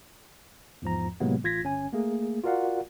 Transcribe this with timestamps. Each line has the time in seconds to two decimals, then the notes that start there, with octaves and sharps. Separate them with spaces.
0.82 E2 G#2 F3 A#5
1.20 A2 C3 F#3 G#3 A#3 B3
1.44 A1 F4 G#6 A#6 B6
1.63 G1 C#4 G#5
1.93 A3 A#3 G#4
2.44 F4 F#4 A#4 D5 F5 F#5